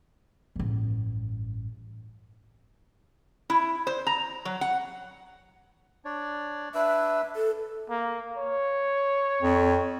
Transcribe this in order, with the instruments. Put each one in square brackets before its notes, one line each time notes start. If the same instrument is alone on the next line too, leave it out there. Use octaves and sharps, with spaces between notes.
[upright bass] A1 G2
[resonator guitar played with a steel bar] E4
C5
A#5
F#3
F#5
[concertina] D4 C#5 D5
[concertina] D4 B4 E6 [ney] E5
[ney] A4
[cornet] A#3
C#5
[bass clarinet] F2